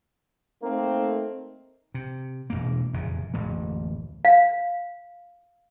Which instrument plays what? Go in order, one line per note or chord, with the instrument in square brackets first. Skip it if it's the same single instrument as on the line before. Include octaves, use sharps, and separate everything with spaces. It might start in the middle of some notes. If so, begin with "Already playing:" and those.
[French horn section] A3 C4 D#4 [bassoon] A#3
[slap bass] C3
E1 C2 A#3
F1 E2 A#2 C#3
D1 A1 F2 A#3
[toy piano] F5